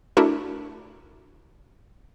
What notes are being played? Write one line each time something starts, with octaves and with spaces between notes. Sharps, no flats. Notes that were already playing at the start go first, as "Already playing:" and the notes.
A3 D4 E4 F#4 A#4